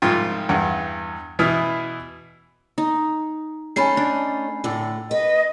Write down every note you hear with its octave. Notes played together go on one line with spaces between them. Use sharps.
C2 G#2 F3 F4 G5
E2 G2 F#5
B2 E3 E4 D#6 F6
D#4
A3 C#4 D#4 G#5 B5 C7
D4
A2 D3
B4 D#5